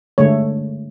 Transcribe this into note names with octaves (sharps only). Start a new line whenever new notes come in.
D3 G#3 A3 C#5